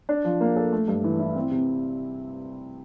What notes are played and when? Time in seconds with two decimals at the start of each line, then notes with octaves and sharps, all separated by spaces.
0.09 D4
0.25 F3
0.41 A#3
0.56 A4
0.73 A3
0.88 G2
1.04 E3
1.19 E4
1.35 C4
1.51 C3